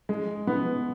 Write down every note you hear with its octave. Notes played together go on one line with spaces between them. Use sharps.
G#3
B3